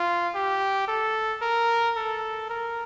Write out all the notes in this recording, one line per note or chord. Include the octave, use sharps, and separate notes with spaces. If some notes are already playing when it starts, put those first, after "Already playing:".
Already playing: F4
G4
A4
A#4
A4
A#4